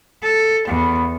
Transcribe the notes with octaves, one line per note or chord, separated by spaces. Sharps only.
A4
E2